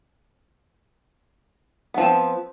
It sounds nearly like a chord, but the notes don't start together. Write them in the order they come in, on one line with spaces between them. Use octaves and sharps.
B3 F3 C4